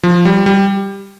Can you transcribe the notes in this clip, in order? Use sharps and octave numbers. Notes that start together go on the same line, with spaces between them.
F3
G3
G3